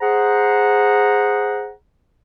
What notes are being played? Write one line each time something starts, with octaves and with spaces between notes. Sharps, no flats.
G#4 C5 F#5 A#5